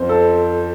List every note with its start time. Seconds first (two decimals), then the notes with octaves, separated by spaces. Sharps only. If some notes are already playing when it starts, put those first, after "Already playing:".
Already playing: F2 C5
0.09 A4